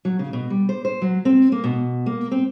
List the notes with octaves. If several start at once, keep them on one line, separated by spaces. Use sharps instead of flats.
F#3
C#3
B2
G3
C5
C5
F#3
C4
A#3
B2
A#3
C4